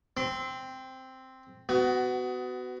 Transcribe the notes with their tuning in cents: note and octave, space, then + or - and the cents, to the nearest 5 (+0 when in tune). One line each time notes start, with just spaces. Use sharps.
C4 +0 C6 -40
B3 +30 F#4 +15